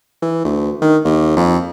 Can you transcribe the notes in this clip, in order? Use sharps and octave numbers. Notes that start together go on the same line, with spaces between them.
E3
D2
D#3
D#2
F2